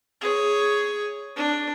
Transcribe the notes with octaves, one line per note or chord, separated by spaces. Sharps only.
G#4 C#5
D4